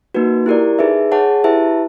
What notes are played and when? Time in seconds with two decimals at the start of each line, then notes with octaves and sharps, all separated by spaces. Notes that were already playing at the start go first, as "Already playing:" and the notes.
0.14 A#3 D#4 F#4 B4
0.46 E4 G4 A#4 D5
0.79 D#4 G#4 B4 E5
1.11 G#4 C#5 F#5 A5
1.44 E4 G4 B4 E5 A5